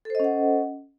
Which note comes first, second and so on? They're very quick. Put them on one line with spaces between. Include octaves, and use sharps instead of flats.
A4 C5 D#5 C#4 F#5